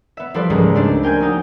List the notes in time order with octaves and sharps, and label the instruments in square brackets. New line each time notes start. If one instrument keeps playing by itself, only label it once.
[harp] B3 E5
F3 G3 E4 A4 B4 D5
C#2 G#2 F3 G3 G#3 A#3
A3 C4 D4
A#4 G5 G#5 G6
F#3 D#4